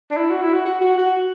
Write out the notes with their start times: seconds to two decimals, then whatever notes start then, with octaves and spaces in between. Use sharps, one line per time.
0.11 D4
0.17 E4
0.30 F#4
0.42 E4
0.53 F#4
0.65 F#4
0.81 F#4
0.97 F#4